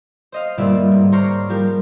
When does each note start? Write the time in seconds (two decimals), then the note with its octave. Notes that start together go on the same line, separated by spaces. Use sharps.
0.32 C5 D#5 F5
0.57 G1 A#2 G3 D5 E5
0.92 G#2
1.12 C5 C#5 A#5 C#6 D6 F6
1.49 F3 G3 G4 A#4